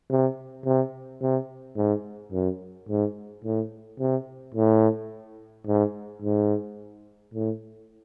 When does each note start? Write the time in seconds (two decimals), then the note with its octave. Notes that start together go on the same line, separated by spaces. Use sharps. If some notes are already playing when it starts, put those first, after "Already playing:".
0.11 C3
0.65 C3
1.21 C3
1.77 G#2
2.32 F#2
2.89 G#2
3.45 A2
4.00 C3
4.55 A2
5.67 G#2
6.22 G#2
7.34 A2